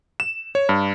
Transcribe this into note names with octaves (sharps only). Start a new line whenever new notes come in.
E7
C#5
G2